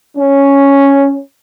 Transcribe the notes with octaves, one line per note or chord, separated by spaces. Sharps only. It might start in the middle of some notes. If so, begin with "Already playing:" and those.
C#4